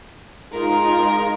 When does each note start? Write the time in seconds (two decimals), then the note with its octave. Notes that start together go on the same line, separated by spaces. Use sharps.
0.53 G#3 D#4 F4 A#4